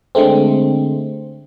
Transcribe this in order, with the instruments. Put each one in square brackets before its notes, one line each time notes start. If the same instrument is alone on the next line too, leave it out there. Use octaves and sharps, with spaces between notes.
[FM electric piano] D3 G#3 A3 C4